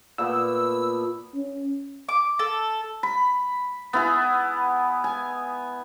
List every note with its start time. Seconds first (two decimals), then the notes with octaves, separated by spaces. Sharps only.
0.18 A#2 A3 B3 E6
1.35 C#4
2.09 D6
2.39 A4
3.03 B5
3.93 B3 E4 G#4
5.04 G#5